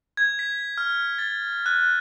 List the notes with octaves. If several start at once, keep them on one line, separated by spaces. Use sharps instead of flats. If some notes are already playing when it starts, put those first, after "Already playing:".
G#6
B6
F6
A6
F#6